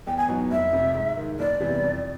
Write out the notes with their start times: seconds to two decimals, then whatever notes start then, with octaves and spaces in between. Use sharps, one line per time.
0.07 E2 G5
0.17 G#5
0.28 B2 F#3 B3 D#4
0.51 F1 E5
0.73 F2 C3
0.95 G#2
1.17 D#3 G#3
1.39 F#1 D5
1.60 E2 C3 E3 G3
1.83 F2